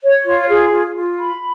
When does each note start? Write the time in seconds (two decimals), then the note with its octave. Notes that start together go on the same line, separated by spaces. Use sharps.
0.02 C#5
0.25 F4
0.48 G#4
0.72 F4
0.95 F4
1.18 B5